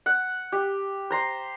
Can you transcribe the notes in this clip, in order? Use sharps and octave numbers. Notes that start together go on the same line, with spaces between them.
F#5
G4
C5 A#5 C6